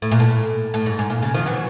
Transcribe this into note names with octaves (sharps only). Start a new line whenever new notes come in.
A2
A#2
A2
A2
G#2
G#2
A#2
C#3
D#3 F3
E3 F#3